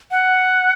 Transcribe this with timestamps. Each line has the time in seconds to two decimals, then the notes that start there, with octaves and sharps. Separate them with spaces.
0.11 F#5